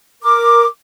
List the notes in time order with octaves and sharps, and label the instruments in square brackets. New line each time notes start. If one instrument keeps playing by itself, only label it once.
[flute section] A#4 D6